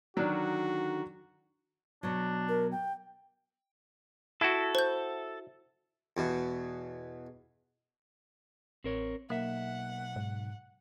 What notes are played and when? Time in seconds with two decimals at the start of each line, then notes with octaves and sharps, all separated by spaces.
0.17 D3 D#3 F#3 D4 F#4
2.03 B2 F#3 D4
2.49 A#4
2.72 G5
4.41 E4 F#4 A4
4.75 C5 G6
6.17 E2 B2
8.84 A1 C4 A#4 C#5
9.30 B1 A#3 E5 F#5
10.16 G#2